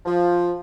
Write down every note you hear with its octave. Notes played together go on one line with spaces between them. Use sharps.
F3